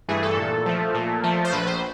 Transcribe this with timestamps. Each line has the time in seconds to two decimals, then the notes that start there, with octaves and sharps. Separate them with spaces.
0.08 G2 E3 A3 G#4
0.23 A4
0.36 A#2
0.66 F3 A3
0.94 A#2
1.23 F3 A3
1.45 C5
1.52 A#1 B4
1.67 C5